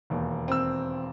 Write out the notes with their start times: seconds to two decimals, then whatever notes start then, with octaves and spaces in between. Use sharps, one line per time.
0.10 E1 D#2
0.48 C4 E6